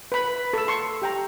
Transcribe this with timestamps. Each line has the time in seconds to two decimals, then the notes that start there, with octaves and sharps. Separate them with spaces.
0.12 B4 B5
0.53 A4 E6
0.68 C6 C#6 E6
1.02 G4 G5 A#5